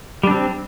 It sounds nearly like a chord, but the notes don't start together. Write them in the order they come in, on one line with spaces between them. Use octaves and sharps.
G3 D4 C4